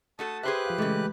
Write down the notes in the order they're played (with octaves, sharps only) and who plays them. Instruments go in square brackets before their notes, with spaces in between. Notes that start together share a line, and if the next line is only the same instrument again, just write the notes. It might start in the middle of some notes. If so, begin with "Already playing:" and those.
[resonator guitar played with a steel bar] A3 F#4 A4 [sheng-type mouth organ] A5 D#6
[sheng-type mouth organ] G4 B4 F#6 [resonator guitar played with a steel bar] G#4 C5 E5
[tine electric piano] F3 F5
[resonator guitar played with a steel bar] A#2 C#3 [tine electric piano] E3 G#3 A3